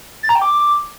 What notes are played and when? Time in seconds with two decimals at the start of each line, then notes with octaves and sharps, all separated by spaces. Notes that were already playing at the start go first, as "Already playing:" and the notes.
0.23 A6
0.29 A#5
0.35 G5
0.42 D6